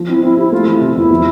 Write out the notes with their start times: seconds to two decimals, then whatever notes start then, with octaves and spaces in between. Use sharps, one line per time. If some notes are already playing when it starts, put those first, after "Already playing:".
Already playing: F3
0.08 C4 E4
0.23 C4 E4
0.37 E4 G4
0.51 A3 F4
0.67 E3 E4
0.81 C3
0.96 E2 E4
1.11 F3